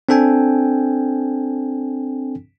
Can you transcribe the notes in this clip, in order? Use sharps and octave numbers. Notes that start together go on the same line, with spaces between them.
C4 D4 A4 G5 G#5